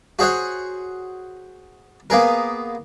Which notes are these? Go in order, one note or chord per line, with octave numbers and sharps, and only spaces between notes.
F#4 G#4 C5 C#5 F#5
A#3 B3 G#4 A#4